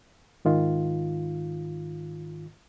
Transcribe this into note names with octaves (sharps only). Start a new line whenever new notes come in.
G#2 D#3 F4